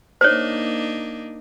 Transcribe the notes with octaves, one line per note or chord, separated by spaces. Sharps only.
A#3 D4 D#4 C5 C#5